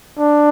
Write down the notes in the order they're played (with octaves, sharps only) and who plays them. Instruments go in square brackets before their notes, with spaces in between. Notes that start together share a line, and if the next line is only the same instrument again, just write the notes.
[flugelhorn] D4